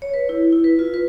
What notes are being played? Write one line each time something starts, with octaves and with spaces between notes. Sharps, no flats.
C#5
B4
E4
E4
B4
F4
B4